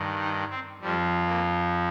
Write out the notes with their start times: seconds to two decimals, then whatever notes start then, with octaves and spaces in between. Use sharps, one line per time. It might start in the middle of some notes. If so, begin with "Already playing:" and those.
Already playing: G2 D#3
0.20 D#4
0.50 C4
0.81 F2 F3 G3
1.27 A#3